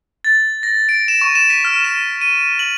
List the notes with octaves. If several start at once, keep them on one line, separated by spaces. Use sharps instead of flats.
A6
A#6
D7
E7
C#6
E7
B6
F6
E7
D#7
F#7